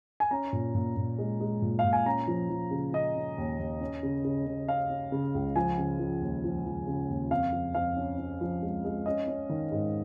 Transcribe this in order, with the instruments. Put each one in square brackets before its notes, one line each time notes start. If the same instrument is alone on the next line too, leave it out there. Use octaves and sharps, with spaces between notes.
[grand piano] G#5
C#4 A#5
A#2
A#2
A#2
G#3
G#3
A#2
F5
A#2
G#5
C#4 A#5
F3
F3
C#3
C#3 D#5
C#4
D#2
D#2
C#4
C#3
C#3
C#3
C#4 F5
C#4
C#3
C#2
F3 G#5
C#3
F3
D#2
F3
F3
C#3
D#2
F2 F5
F2
F2 F5
C#4
C#4
F3
G#3
G#3
C#4 D#5
C#4
D#3
G#2